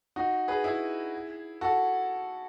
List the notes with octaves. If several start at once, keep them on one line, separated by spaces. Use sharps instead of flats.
D#4 F#4
G#4 B4
E4 G#4
F#4 A4